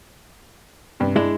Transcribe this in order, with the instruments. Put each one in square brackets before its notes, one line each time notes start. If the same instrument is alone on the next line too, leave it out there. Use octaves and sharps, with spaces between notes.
[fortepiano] G2 C3
[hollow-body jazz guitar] G#3 E4 [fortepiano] D4